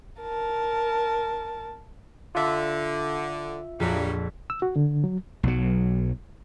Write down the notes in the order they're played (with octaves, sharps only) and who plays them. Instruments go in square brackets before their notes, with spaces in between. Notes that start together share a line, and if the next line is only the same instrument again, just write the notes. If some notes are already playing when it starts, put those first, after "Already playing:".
[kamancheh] A#4 A5
[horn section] D3 [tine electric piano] F4 E5
[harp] A#1 F2 B6 [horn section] F#3 G3
[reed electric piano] E6
F#4
D3
F#3
[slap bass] B1 F#3